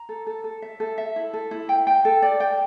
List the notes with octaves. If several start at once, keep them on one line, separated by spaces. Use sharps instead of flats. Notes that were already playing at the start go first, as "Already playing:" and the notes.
Already playing: A#5
A4
A4
A4
E5
A4
E5
E4
A4
E4
G5
G5
A4
D5
G5